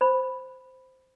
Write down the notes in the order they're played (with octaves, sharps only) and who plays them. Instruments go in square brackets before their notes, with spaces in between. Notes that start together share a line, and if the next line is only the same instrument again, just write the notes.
[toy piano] C5 B5